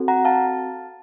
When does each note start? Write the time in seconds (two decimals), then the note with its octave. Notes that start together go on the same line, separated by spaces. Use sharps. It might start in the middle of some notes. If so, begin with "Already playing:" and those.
Already playing: C4 F#4 A4
0.08 F#5 A#5
0.25 F5 A5